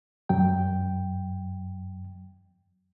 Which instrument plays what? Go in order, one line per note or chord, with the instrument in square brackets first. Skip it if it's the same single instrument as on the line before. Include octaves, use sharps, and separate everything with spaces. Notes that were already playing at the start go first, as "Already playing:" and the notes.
[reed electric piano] F#2 F#3 G5